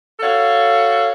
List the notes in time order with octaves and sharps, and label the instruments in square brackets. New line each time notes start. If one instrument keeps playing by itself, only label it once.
[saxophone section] F#4 A4 C#5 F5